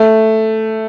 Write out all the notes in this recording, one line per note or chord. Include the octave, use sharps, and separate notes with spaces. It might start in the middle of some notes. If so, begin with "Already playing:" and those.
Already playing: A3